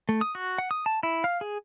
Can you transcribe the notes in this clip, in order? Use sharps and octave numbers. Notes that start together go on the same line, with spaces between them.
A3
D#6
F#4
F#5
D#6
A5
E4
F5
G#4